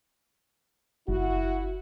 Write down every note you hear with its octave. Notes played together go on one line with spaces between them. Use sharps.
F#1 E4 F#4